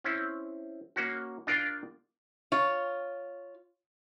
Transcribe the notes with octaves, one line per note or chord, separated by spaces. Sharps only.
C4 C#4 E4
A#3 C#4 F#4
D4 F4 A#4 D5 F5 G5
F4 C#5